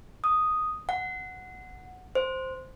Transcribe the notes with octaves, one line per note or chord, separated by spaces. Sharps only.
D#6
F#5
C5